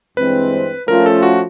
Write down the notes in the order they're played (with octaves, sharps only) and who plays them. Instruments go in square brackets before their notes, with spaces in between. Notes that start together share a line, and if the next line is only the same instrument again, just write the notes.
[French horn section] G2 E3 G#3 C4 [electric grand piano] B4
[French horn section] F3 A3 C#4 F4 [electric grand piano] A#4
[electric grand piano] A4
F#4